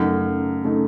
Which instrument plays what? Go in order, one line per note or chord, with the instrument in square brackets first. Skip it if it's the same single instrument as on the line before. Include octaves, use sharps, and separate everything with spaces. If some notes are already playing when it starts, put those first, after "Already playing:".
Already playing: [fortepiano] F#2 [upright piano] C#3 A3 D#4
[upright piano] C#3 A3 D#4